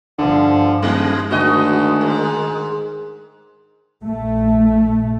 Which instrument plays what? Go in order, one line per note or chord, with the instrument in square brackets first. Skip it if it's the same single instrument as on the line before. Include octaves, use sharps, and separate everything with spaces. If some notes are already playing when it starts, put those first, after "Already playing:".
[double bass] G1 F3 [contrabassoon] D3
[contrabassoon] D#1 [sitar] G3
[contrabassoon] D2 [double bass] D#3 G#3 [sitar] F#4 D#5
[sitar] G#2
[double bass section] A#1 A3